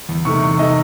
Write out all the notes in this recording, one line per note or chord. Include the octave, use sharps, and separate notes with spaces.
E2
C3 D#3 A3 C#6
E2 C#6
C3 D#3 A3 D#5